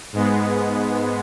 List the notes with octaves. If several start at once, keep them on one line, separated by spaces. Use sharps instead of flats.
G#2 G#3 B3